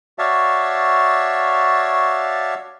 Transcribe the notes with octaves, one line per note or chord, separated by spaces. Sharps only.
F#4 C#5 D5 E5 F5 A5